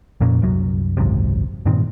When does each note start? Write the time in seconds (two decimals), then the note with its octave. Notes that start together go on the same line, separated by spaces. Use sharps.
0.21 F2 A#2 A#3 C#4
0.42 C2 F#2 F#3
0.97 G#1 C#2 F#2 C3
1.66 G2 A#2 D#3 C4